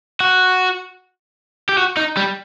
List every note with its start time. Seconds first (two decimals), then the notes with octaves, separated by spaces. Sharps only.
0.20 F#4
1.69 G4
1.77 F#4
1.97 D#4
2.17 G3